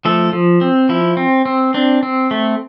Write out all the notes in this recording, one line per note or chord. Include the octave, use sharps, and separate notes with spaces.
F3 A3 A4
F3
C4
F3 E4
C4
C4
C4 D4
C4
A3